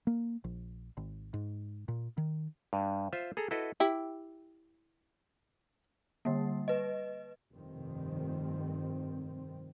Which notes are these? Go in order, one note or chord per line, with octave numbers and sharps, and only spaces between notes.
A#3
A#1
G#1
G#2
A#2
D#3
G2
F4 C5 E5
G#4 A4 A#5
E4 F#4 A4 B4 D#5
E4 G4
D3 G3 A#3
B4 D#5
F1 G2 D#3 C4